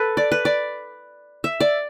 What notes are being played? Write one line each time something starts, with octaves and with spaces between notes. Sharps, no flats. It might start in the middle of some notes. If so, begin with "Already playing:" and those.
Already playing: A4 B4
D5
B4
D5
E5
D5